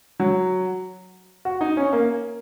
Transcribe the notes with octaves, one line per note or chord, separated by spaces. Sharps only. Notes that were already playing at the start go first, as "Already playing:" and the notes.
F#3
F#4
D#4
C#4
A#3